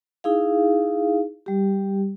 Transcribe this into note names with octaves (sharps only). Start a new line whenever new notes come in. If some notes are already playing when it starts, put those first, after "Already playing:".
D#4 E4 G#4 F5
G3 G4